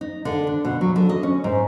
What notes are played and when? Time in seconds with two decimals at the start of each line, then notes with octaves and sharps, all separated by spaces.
0.01 D#4
0.25 D3
0.47 D4
0.65 B2
0.81 F#3
0.96 D3
1.09 D#5
1.23 C#4
1.44 G#2